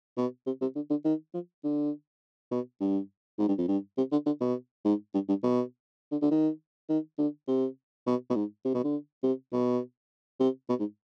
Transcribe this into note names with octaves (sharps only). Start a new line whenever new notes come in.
B2
C3
C3
D3
D3
D#3
F3
D3
B2
G2
G#2
G2
F2
G2
C3
D3
D3
B2
G#2
G2
G2
B2
D3
D3
D#3
D#3
D3
C3
B2
B2
G#2
C3
B2
D3
C3
B2
C3
B2
G#2